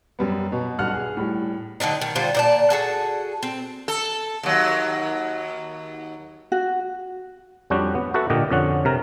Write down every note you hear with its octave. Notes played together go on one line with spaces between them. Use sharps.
F#2 G3 B3
B2
B1 G2 F#5 F6 F#6
G#4
A2 G3
D3 F#3 C4 D#4
D#3
D3 G3 F4 C5
A#2 D5 A5
F#4 G#4 A4
C4
A4
D#2 F#3
F#4
F2 G3 C#4 D4 F#4 G4
B3
F#4 A4 B4 E5 F#5
A#2 D3 G4 D#5
F2 D3 C#4 F#5
C3 A#4